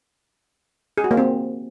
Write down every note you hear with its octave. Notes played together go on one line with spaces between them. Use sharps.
G#4
F#4
A#3
C4